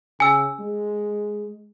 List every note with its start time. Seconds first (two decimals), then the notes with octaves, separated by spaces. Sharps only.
0.20 C#3 G#5 E6
0.60 G#3